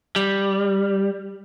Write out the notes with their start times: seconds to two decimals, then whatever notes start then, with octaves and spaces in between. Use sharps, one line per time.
0.16 G3